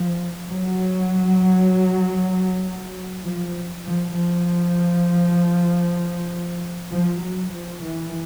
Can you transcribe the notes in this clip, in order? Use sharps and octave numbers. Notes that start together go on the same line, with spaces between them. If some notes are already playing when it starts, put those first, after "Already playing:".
Already playing: F3
F#3
F3
F3
F3
F3
F#3
F3
E3